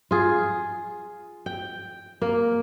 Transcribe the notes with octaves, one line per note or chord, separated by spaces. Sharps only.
F4 G#4
G5
A#3